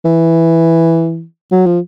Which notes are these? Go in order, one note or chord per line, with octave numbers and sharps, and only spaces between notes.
E3
F#3
F3